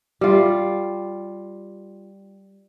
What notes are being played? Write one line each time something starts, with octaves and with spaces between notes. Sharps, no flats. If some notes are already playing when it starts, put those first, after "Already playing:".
G3 F4